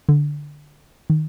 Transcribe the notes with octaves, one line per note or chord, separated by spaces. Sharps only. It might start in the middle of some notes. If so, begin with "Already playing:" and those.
D3
D#3